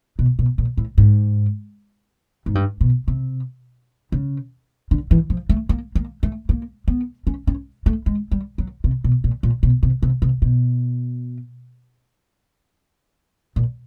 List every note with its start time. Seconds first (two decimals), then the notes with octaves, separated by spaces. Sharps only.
0.19 B2
0.39 B2
0.58 A#2
0.77 A2
0.98 G#2
2.46 G#2
2.55 G2
2.81 B2
3.08 C3
4.12 C#3
4.91 D3
5.11 E3
5.30 F3
5.49 A3
5.69 A#3
5.95 A#3
6.23 A3
6.49 A#3
6.88 B3
7.27 C#4
7.47 C#4
7.86 A3
8.06 G#3
8.31 G3
8.58 F#3
8.84 C3
9.04 B2
9.24 A#2
9.43 A#2
9.63 B2
9.83 C3
10.03 C3
10.22 C3
10.42 B2
13.56 A#2